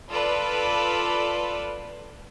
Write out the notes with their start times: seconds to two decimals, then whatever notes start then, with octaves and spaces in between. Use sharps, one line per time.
0.10 F4 A4 B4 D5